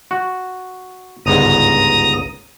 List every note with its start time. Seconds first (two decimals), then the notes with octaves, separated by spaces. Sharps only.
0.11 F#4
1.26 G1 C#2 G#2 A#5 D#6